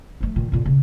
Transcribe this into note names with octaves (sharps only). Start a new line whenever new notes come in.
F3 A3
A#2 D#3
F2 A#2
C#3